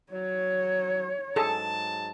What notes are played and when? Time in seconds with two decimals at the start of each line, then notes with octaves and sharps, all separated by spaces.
0.13 F#3 C#5
1.36 G#2 F#3 G#4 A4 A5